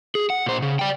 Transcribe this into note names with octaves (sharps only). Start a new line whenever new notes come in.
G#4
F#5
A#2 C5
C#3
D5 G5